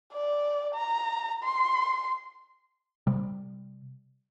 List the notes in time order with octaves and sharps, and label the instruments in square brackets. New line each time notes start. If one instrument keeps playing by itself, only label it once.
[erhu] D5
A#5
C6
[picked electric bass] C3 G3